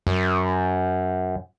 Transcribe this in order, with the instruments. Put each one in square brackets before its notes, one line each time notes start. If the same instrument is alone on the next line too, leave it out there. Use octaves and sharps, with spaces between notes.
[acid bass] F#2